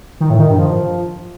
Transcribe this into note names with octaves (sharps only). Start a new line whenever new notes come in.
D#3
A2
D#3
G2
F3